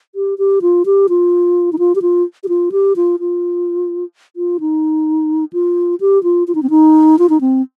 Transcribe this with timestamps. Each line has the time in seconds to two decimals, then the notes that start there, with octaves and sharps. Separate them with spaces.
0.15 G4
0.38 G4
0.62 F4
0.86 G4
1.09 F4
1.73 D#4
1.79 F4
1.95 G4
2.02 F4
2.44 G4
2.49 F4
2.72 G4
2.96 F4
3.20 F4
4.36 F4
4.60 D#4
5.53 F4
6.00 G4
6.23 F4
6.48 F4
6.55 D#4
6.63 C4
6.70 D#4
7.19 F4
7.29 D#4
7.41 C4